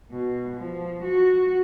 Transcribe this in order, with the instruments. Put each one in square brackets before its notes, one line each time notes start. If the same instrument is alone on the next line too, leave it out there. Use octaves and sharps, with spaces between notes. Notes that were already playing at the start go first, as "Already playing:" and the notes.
[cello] B2
F3
F#4